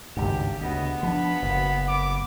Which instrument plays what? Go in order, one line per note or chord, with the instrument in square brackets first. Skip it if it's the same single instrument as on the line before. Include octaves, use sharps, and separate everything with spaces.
[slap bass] G#1 C#2 G2 [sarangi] G4
[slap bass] D2 C#3 [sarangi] B3 [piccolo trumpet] D#5
[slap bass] F3 D4 [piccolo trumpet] B5
[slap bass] F#1
[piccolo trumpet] D6